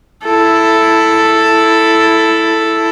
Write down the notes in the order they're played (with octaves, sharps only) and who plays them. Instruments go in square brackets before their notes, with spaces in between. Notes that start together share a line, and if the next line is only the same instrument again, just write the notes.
[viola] E4 A4